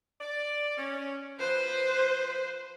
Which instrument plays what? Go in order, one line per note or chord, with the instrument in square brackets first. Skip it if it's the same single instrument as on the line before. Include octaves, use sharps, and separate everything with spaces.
[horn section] D5
C#4
[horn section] F3 B4 [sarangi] C5